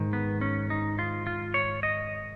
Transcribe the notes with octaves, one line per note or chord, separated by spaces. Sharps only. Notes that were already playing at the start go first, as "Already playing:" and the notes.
Already playing: G#2 D#3
B3
C#4
D#4
F4
F4
C#5
D#5